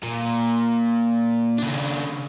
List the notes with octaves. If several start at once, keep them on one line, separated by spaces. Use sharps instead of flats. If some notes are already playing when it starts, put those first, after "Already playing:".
A#2
C#3 D4